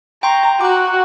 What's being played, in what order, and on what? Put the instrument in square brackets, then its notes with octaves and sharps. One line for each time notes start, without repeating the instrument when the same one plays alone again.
[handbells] G5 C6 C#6 [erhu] A#5
[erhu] F#4 [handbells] D6 F#6